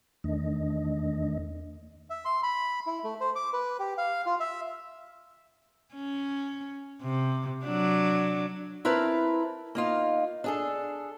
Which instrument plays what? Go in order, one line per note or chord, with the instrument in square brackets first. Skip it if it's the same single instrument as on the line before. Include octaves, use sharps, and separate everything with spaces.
[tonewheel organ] E2 D#3 A3 D4 D#5
[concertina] E5
C6
B5
E4
A3
C5
D6
B4
G4
F5
F4
E5
[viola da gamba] C#4
C3
F#3 D4
[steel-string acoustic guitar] C4 E4 A#4 B4 A5
A#3 D#4 F4
D4 G#4 A4